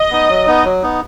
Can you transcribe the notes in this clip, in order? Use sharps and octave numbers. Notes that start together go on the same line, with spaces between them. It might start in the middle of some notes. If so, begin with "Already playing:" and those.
Already playing: D#5
B3 D#4
F#3
B3 D#4
F#3
B3 D#4